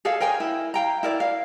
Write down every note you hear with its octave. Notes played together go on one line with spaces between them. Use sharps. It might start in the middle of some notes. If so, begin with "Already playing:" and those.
G#4 A4 D5 F5
A#4 C#5 G5 G#5
E4
F5 G5 A#5
E4 A#4 D5
F5